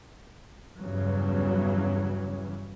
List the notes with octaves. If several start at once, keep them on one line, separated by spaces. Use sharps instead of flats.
E2 G2 C#3 E3 F#3